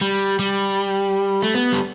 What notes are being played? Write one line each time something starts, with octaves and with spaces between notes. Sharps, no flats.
G3
G3
A3
B3
G3